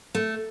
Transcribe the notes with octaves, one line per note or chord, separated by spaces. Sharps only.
A3